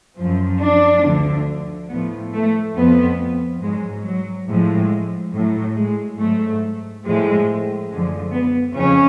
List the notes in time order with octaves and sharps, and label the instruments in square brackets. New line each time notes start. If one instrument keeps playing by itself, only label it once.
[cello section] F#2 F3
D4
D2 D3 F3
A2 F3 B3
A3
F2 F3 B3
G#2 F#3 G#3
F#3
A2 F3 G#3
A2 F#3
G#3
G#2 F#3 A3
A2 F3 G#3
F#2 D3 F3 G#3
B3
F2 C#3 F3 C#4